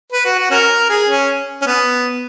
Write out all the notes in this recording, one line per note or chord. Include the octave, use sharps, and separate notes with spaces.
B4
F#4
F#4
C#4 F#4 A#4
G#4
C#4
C#4
B3